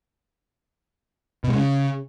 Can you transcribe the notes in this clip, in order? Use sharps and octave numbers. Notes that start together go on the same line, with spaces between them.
B2
G#3
C#3